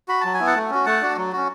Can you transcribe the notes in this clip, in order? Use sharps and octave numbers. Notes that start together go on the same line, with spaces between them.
F#4 B5
F#3 A5
G#5
B3 E4
F#5 A5
A3
C#4 F#4
A3 F#5 A5
D4 F#4
F#3
C#4 F#4